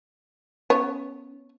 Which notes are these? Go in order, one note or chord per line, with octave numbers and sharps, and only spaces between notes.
B3 C#4 C#5